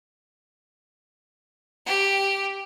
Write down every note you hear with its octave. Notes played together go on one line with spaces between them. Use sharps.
G4